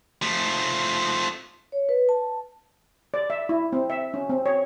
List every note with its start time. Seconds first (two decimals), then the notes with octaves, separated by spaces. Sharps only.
0.22 F3 A3
1.72 C#5
1.89 B4
2.09 A5
3.14 D5
3.30 E5
3.49 E4
3.73 C4
3.90 E5
4.14 C#4
4.30 C4
4.46 C#5